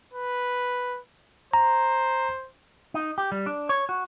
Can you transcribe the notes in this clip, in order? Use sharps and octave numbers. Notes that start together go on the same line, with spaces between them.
B4
C5 A#5
D#4
G4
G3
D4
C#5
F#4